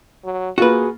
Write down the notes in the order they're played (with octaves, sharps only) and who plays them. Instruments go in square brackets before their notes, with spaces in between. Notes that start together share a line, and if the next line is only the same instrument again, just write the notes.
[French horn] F#3
[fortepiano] A#3 F4 [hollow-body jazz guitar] F#4 B4 [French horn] G#4